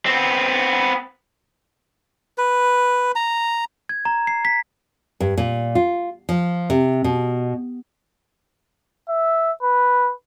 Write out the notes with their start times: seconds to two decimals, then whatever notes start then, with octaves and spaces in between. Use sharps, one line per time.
0.06 B3 C4
2.38 B4
3.15 A#5
3.89 G#6
4.05 A#5
4.27 C7
4.45 B6
5.20 G2
5.37 A#2
5.75 F4
6.29 F3
6.70 C3
7.04 B2
9.09 E5
9.63 B4